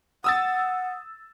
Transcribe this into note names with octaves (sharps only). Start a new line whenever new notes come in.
F#5 D#6 E6 A6